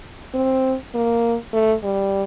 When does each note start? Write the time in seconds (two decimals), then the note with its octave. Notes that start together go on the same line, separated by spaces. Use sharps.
0.34 C4
0.94 A#3
1.53 A3
1.83 G3